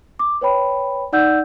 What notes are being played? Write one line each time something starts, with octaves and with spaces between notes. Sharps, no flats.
D6
B4 C#5 G5 B5
D#4 D5 F#5 E6 G6